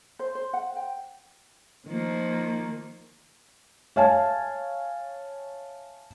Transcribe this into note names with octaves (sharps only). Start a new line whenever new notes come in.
C5
C5
F#5
G5
D#3 F3 A#3
C#5 E5 F5 G#5 A5